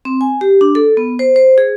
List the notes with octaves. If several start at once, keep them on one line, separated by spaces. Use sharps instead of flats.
C4
G#5
G4
D4
A4
B3
C5
C5
G#4